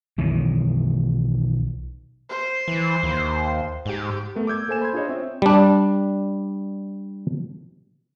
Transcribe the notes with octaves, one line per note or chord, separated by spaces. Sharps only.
B1 D#3 E3 F#3
C5
E3
D#2
G#2 G4
A3 B3 A#4
D6 E6 G6 G#6
A#3 A4 C5 G#5 E7
B5 C6 G#6
D4 F4 G#4 C5 C#5 D#5
C4 C#5 E5
G3 D4